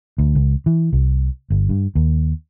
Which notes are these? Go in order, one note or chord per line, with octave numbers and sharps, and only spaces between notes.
D2
C#2
E3
C2
G1
G2
D#2